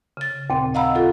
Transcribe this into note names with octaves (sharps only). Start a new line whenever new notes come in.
C#3 A6
D#2 A#2 C4
D#5 F5 F#5 A#5 B5 E6
F4 A4